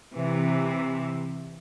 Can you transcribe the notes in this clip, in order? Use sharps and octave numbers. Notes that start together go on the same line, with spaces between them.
C3 E3